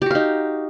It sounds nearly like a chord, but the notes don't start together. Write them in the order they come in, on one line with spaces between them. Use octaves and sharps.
G4 F#4 F5 D#4